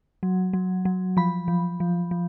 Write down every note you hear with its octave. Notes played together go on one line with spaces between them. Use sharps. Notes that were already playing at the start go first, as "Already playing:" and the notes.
F#3
F#3
F#3
F3 B5
F3
F3
F3